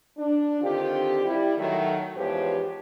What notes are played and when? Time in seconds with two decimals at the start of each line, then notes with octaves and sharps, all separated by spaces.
0.17 D4
0.62 D3 D#3 C4 F4 G4
1.24 G3 E4
1.58 D#3 F#3 A3
2.16 E2 G#2 F3 G4 B4 C#5